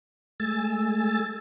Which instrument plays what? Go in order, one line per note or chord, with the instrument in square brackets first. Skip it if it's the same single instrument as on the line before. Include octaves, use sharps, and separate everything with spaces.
[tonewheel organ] G#3 A3 G#5 E6 A6